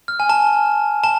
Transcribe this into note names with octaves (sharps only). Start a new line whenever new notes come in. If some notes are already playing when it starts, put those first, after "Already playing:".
F6
G#5
A5
A5